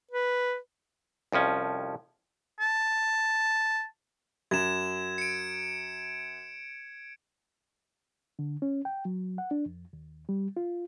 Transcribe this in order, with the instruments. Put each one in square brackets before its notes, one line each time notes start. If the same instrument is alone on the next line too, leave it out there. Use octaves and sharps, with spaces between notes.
[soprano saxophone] B4
[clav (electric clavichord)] C2 F2 F3 C#4
[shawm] A5
[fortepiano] F#2 [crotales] G#6 E7
[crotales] C#7 D7
[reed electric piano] D3
C#4
G5
F#3
F#5
D4
F2
D#2
G3
F4